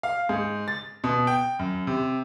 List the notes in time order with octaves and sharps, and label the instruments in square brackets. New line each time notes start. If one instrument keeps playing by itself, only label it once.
[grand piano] F5
G#2
A6
B2
G5
F#2
C3